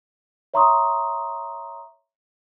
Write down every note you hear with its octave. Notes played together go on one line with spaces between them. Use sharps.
C#5 E5 A#5 C6 C#6 D#6